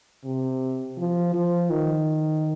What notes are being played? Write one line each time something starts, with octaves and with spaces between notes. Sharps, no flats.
C3
F3
F3
D#3